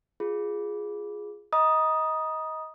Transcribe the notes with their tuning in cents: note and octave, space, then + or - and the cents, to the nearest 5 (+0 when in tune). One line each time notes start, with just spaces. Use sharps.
F4 +0 G#4 +0
D#5 +20 A#5 +40 D#6 +0